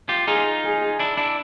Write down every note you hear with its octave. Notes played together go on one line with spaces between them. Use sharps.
F4 G4
D#4 F4 G#4
G#4
D4 E4
D4 E4